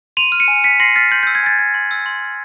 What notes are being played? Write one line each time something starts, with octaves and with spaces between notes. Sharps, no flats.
C6 D#7 F7
F6
C#7 D#7
G#5
G#5 B6 C#7
C6 A#6 C7
F6 A6 B6
C6 G6
E6 G6
G#6
G#5 G6 A6
G6 G#6
C6
E6
C6
F6